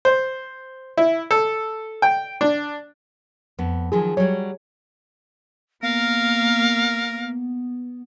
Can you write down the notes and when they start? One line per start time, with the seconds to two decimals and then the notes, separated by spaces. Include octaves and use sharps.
0.05 C5
0.97 E4
1.31 A4
2.02 G5
2.41 D4
3.59 F2 B3
3.92 D#3 F3 F#3 G#4
4.17 F#3 G3 C#5
5.83 A#3 B3 A#4 F5